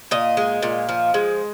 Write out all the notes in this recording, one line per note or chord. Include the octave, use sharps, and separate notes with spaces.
A#2 D#5
G#3
A#2
F3
G#3